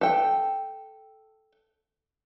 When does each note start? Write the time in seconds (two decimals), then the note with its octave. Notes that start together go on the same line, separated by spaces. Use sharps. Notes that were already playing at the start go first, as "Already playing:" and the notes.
0.01 A4 G5